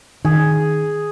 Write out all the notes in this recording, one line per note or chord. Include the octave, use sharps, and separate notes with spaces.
D#3 G#4